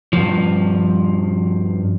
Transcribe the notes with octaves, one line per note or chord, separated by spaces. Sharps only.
G2 F3